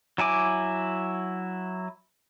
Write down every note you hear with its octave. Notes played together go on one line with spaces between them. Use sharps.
F#3 E4 G#5 D6